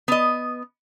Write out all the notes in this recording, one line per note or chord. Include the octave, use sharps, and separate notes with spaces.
B3 D#5